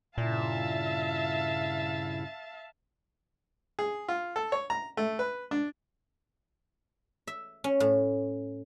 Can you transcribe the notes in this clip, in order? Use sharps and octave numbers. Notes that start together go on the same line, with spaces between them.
G2 A#2 C#3 E4 E5 F5 A5
G#4
F4
A4
C#5
A#5
A3
B4
D4
E5
C#4
A2